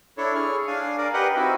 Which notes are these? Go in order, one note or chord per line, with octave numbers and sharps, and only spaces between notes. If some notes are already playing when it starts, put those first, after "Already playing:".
D4 E4 A4 C#5
G#4 C#6 F6
D4 F5 G#5
A#4 D5
G4 A#4 B4 D#5 F#5
C4 D#4 E4 F#4